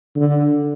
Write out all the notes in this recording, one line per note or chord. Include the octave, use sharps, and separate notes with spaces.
D3